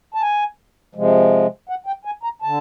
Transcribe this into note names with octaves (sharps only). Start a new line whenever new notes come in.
A5
G#5
C3 F3 G#3
F#5
G5
G#5
A#5
D3 A5